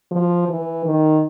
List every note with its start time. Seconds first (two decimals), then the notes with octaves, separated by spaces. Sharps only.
0.11 F3
0.49 E3
0.85 D#3